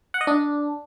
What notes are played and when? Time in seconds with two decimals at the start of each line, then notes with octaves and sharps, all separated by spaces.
0.14 F#5
0.21 D#5
0.27 D4